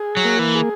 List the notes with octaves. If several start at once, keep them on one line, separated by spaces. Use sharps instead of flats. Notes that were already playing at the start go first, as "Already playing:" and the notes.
Already playing: G#4
F#3
A#3
E3
G#4